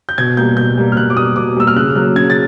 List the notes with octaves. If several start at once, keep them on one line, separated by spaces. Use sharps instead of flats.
G6
B2 G#6
G3 A#3 G6
B2 G6
G3 A#3
F6
B2 F#6
D6
G3 A#3 D#6
B2 D6
G3 A#3 E6
F6
C#3 F#6
F#3 A#3 F#6
C#3 G#6
A6